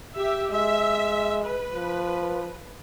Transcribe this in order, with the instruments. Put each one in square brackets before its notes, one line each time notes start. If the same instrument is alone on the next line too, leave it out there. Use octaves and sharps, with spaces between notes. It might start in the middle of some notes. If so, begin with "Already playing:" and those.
[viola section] G4 E5
[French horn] G#3 [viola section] E5
[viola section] B4
[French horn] F3